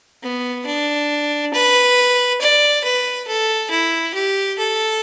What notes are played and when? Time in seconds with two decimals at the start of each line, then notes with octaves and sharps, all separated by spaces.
0.23 B3
0.66 D4
1.54 B4
2.41 D5
2.84 B4
3.27 A4
3.70 E4
4.14 G4
4.58 A4